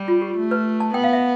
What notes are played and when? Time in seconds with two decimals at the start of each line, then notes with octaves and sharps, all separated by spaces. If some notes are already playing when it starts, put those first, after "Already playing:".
Already playing: G3
0.08 F4
0.22 G4
0.37 A3
0.51 B4
0.80 A5
0.94 B3 G5
1.04 F5
1.13 E5